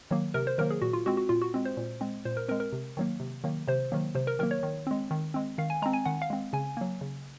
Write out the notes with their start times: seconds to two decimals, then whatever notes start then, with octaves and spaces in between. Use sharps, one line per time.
0.11 D#3 F#3 A#3
0.34 C3 A#4
0.47 C5
0.58 D#3 F#3 A#3 A#4
0.71 G#4
0.82 A#2 F#4
0.93 F4
1.06 G#3 C4 F#4
1.17 F#4
1.29 A#2 F4
1.42 F#4
1.54 G#3 C4
1.65 C5
1.77 A#2
2.01 G#3 C4
2.25 A#2 C5
2.37 A#4
2.49 G#3 C4 A#4
2.60 A#4
2.72 C3
2.97 D#3 F#3 A#3
3.20 C3
3.44 D#3 F#3 A#3
3.68 C3 C5
3.92 D#3 F#3 A#3
4.15 C3 C5
4.27 A#4
4.39 D#3 F#3 A#3 A#4
4.51 C#5
4.63 D#3
4.87 G#3 C4
5.11 D#3
5.34 G#3 C4
5.58 D#3 F5
5.70 G#5
5.82 G#3 C4 A#5
5.93 G#5
6.06 D#3 F#5
6.22 F5
6.30 G#3 C4
6.53 C#3 G#5
6.77 F#3 A#3
7.01 C#3